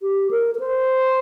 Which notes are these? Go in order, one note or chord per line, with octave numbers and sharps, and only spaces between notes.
G4
A#4
A#4
C5